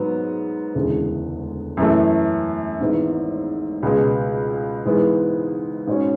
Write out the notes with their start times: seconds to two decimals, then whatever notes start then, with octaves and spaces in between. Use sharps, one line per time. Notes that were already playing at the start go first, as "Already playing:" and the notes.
Already playing: G#2 F#3 B3
0.74 E1 D2 C#3 E3 G#3
1.77 F#2 E3 A3
2.80 G#1 G#2 E3 B3 E4
3.83 C#2 B2 G#3
4.85 G#2 E3 G#3 B3
5.87 G#2 G#3 C#4 F#4 C#5